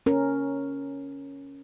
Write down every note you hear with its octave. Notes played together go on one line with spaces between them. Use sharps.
C#4 A#4